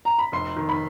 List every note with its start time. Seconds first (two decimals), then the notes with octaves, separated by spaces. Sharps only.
0.05 A#5
0.19 B5
0.32 F1 C6
0.56 D#3
0.69 B5